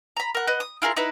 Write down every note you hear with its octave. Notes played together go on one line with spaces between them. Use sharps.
A#5 B5
A#4 F#5
B4 D#5 F#5
D#6
E4 F4 G#4 A#4
D#4 E4 B4